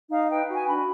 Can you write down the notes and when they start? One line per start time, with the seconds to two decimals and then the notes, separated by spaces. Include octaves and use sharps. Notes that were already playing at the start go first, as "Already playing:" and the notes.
0.11 D#4 F5
0.30 B4 G5
0.49 F#4
0.55 G#5
0.68 D4 B5